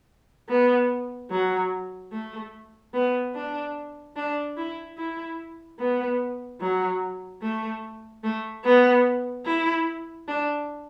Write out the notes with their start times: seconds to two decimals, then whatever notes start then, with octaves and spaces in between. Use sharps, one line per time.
0.49 B3
1.31 F#3
2.12 A3
2.94 B3
3.34 D4
4.16 D4
4.57 E4
4.97 E4
5.79 B3
6.61 F#3
7.42 A3
8.24 A3
8.65 B3
9.46 E4
10.28 D4